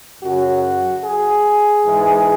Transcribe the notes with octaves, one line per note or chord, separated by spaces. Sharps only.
F#2 C#3 F#3 F#4
G#4
G#2 E3